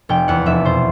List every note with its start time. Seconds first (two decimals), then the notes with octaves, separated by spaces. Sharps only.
0.09 F1 G5
0.28 E2 F#5
0.46 F1 E5
0.65 B2 C5